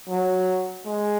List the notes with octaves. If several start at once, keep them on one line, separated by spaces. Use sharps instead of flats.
F#3
G#3